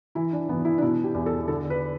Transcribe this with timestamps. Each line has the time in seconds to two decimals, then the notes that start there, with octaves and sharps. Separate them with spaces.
0.15 E3 E4
0.33 D4
0.49 E3 B3
0.65 E4
0.78 D4
0.82 B2 E4
1.04 G4
1.14 E2
1.26 A4
1.48 D3 A4
1.70 B4